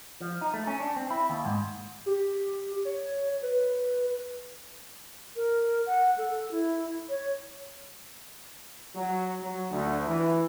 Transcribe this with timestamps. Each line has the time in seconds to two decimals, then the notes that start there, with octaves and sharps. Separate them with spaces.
0.21 F3
0.41 D#4
0.54 A3
0.67 C#4
0.80 D4
0.96 C4
1.10 E4
1.30 D#2
1.45 G#2
2.06 G4
2.85 C#5
3.42 B4
5.36 A#4
5.86 F#5
6.18 A4
6.51 E4
7.09 C#5
8.95 F#3
9.41 F#3
9.71 D2
10.07 E3